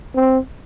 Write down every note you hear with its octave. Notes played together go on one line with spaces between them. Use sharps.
C4